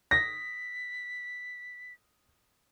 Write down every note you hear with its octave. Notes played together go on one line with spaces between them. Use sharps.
A#6 B6